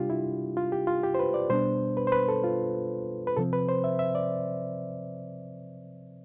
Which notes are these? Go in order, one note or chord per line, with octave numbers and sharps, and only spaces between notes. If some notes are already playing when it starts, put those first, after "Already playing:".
Already playing: C3 G3 D4 F4 G4
E4
F4
G4
F4
G4
C5
B4
D5
B2 G3 B3 D4 C5
B4
C5
B4
A4
F4
B4
C3 F3 C4 A4
B4
C5
E5
E5
D5